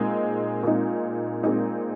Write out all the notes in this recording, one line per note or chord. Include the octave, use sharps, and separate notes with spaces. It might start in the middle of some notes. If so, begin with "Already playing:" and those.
Already playing: A#2 G#3 C4 D#4
A#2 G#3 C4 D#4
A#2 G#3 C4 D#4